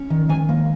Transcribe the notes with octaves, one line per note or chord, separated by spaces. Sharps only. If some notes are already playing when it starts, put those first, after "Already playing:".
Already playing: C#4
D#3
D#3 G#5
A#3